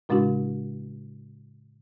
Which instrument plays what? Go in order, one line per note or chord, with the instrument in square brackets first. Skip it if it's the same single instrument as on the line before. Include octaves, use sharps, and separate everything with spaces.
[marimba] A2 C#3 G#3 D4 E4 F#4